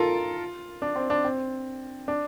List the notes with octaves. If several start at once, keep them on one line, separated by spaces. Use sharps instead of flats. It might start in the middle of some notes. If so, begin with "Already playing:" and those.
Already playing: F4 A4 A#4
D4
C4
D4
C4
D4